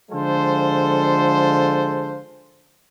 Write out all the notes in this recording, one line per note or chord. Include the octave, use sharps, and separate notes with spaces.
D3 F3 G#3 F4 A4 C5